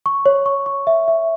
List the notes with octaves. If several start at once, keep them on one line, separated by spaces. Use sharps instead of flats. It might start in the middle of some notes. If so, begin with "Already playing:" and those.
C#6
C#5
C#6
C#6
E5
E5